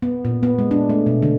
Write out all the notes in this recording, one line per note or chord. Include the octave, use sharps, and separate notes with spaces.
B3
A#2
B3
G#3
D4
A3
B2
D3